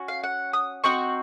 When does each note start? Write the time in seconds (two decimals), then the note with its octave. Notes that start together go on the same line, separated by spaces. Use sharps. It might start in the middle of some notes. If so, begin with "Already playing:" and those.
Already playing: C#4 F#4
0.08 F5
0.24 F#5
0.53 D#6
0.84 C4 D#4 F#4 C#6